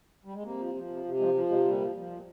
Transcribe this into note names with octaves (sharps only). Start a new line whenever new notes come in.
G3
G#3
C3 A#3
F3
F3
C3
C3
F3 G#3
F3 G3
C3 G#3
A#2 G3
F3
F3
A#2